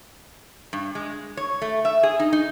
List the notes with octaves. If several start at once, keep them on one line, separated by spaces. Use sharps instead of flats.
G2
G#3
C#5
A3
E5
G#4
D#4
D#4